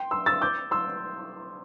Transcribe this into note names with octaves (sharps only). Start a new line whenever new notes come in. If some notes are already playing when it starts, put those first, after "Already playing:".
Already playing: G5 C6
C6 E6
E6 A6
D6 G6
C6 E6